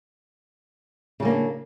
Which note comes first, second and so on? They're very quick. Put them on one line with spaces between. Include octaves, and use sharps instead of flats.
C#3 G3 A#3 D4 F#3